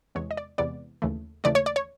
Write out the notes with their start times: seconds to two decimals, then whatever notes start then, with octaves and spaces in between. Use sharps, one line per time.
0.15 E2 C3 E3 G#3 B3 C#5
0.31 D#5
0.37 D5
0.58 E2 C3 E3 G#3 B3 D5
1.02 D#2 C#3 E3 A3
1.44 D#2 C#3 E3 A3 D5
1.55 C#5
1.66 D5
1.76 C#5